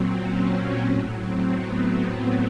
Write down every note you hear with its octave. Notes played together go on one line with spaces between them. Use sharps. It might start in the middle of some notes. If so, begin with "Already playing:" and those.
Already playing: A#2 F#3 C4
C#4
A2 F#3 C#4
C4
B3